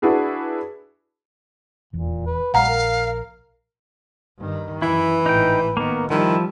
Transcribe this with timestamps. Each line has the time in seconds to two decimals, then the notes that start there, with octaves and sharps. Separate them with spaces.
0.02 D4 E4 F#4 G#4 B4
1.93 D#1 E2 A#2
2.26 B4
2.54 A#1 G3 F5 F#5 A#5
2.68 A#4
4.39 G2 D#3
4.82 F#2 E3 E4 B4
5.26 G#1 A2 D#4 G5
5.77 D#3 A#3 B3
6.10 D#3 F3 G3 E4